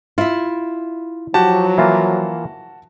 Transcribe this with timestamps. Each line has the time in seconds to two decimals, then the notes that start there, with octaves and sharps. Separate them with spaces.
0.18 E4 F4 E5
1.34 F3 F#3 F#4 G4 A5
1.78 E3 A#3 F4